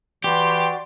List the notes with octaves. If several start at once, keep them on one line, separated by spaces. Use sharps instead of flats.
E3 F#4 G4 D5 C6